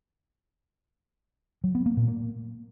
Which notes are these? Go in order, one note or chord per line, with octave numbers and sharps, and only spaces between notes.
F#3
B3
A#3
A#2
A#3